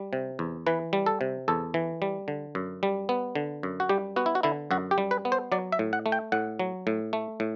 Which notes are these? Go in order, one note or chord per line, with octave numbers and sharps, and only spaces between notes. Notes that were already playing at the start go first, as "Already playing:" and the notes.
Already playing: G3
C3
E2
E3 B4
G3
A4
C3
E2 A4
E3
G3
D3
F#2
G3
B3
D3
F#2
F#4
G3 G4
B3 F#4
E4
F#4
D3 E4
F#2 F#4
G4
G3
B4
B3
C5
F#3 D5
E5
A2
F#5
A3
G5
A2 F#5
F#3
A2
A3
A2